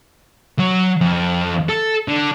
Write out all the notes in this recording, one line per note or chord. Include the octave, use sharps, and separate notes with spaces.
F#3
F2
A4
D3